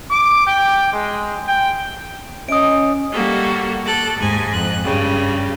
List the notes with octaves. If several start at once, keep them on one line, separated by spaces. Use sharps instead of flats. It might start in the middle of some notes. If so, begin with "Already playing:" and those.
D6
G5
G#3
G5
C#4 D#5 D#6 D7
G3 A#3 F#4 A4
A4 D6 F#6
D#2 G#2 G#5
F2 F#6
G2 C#3 G3